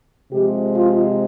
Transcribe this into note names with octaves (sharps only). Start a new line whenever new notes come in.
C3 F3 G#3 G4
F4